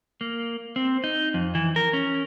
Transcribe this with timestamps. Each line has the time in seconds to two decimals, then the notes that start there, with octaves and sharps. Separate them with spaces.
0.21 A#3
0.76 C4
1.04 D#4
1.34 F2
1.55 E3
1.76 A#4
1.93 C#4